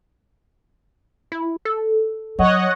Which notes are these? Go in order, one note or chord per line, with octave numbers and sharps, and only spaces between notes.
E4
A4
F#3 C#5 D#5 F#5